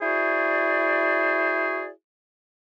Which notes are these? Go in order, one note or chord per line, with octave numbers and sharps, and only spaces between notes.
E4 F#4 G#4 C5 D5